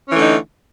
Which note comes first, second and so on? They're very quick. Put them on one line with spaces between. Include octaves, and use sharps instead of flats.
C#4 E3 A3 D3 D#4